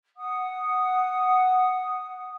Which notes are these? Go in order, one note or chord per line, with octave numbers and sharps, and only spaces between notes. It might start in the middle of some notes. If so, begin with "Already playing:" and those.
F#5 D#6